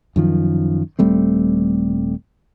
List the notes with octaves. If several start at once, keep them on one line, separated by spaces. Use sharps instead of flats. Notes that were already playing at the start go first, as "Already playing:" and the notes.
F#2 D#3 F3
D#1 G3 A3 C4